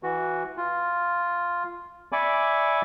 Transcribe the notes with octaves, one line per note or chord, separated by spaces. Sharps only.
E3 F#4
F4
D5 E5 G#5 B5 C#6 D6